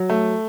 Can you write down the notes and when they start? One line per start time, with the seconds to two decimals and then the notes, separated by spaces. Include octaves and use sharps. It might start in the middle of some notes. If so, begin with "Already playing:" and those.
Already playing: F#3
0.10 A3